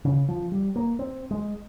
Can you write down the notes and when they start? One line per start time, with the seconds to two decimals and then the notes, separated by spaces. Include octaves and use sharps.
0.05 C#3
0.29 F3
0.52 G3
0.76 A#3
0.99 C4
1.31 G#3